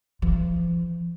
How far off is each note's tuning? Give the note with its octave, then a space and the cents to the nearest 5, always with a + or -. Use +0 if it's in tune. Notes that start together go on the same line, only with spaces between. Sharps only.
F3 -40